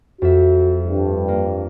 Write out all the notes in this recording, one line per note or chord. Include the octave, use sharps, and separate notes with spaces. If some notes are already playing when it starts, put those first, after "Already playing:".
F2 F#4 E5
G2
A#3